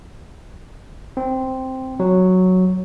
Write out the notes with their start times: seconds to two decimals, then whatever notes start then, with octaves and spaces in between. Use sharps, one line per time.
1.17 C4
2.00 F#3